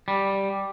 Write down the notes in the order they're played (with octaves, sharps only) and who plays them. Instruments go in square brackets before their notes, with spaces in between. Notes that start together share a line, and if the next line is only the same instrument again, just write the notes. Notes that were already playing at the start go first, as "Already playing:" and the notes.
[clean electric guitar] G3